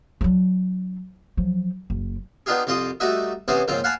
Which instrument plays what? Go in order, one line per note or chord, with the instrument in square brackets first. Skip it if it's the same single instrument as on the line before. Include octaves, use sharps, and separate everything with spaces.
[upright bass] F#3 D4
F3 F#3
F#1
[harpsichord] B3 D4 D#4 F4 G4 G#4
C2 F2 F4 C6 D6 D#6
G3 A3 D#4 F#4 D#5 E5
C3 E3 B3 C#4 G#4 C5
A#1 G#2 C#3 C4 F4
F5 F#5 G#5 A5 B5 D6